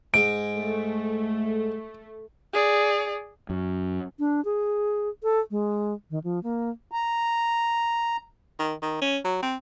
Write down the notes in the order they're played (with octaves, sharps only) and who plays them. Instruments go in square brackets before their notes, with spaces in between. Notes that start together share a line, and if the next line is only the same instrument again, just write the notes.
[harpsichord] G#2 G#3 [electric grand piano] D7
[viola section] A3
[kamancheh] G#4 D5
[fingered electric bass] F#2
[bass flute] D4
G#4
A4
G#3
D#3
F3
A#3
[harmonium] A#5
[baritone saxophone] D#3
D#3
C#4
F#3
C4